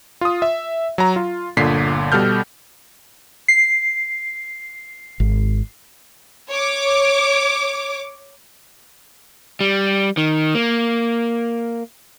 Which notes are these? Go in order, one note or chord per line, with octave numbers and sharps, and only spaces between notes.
F4 D#6
E5
F#3 A#5
F4
G1 A#2 D3 B6 C7
B2 G3 A4 F6 G6
C7
G#1
C#5 D6
G3
D#3
A#3